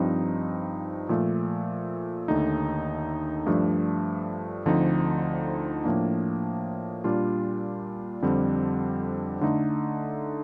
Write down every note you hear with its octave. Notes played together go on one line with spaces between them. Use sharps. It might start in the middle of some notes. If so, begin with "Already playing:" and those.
Already playing: G2 F3 C4 D#4
A#2 F3 A3
D#2 D3 A3 D#4
G2 F3 A3 D4
D2 D3 F3 C4 D#4
A2 F3 A#3 D4
A#2 G3 D4 F4
F2 D3 G3 C4
D3 A3 D#4